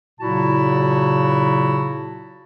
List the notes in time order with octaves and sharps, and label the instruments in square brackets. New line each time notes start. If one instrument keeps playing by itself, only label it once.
[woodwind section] A#2 C#3 F#3 E4 F#4 A5